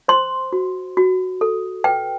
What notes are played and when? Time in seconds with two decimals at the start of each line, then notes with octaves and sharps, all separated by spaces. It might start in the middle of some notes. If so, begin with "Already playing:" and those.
0.08 C5 C6
0.53 F#4
0.97 F#4
1.41 A4
1.84 B4 G5